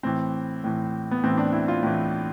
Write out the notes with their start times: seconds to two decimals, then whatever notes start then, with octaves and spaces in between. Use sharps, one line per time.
0.03 A2 E3 C4
0.64 A2 E3
1.11 B3
1.23 A2 E3 C4
1.37 D4
1.52 E4
1.68 F4
1.83 A2 E3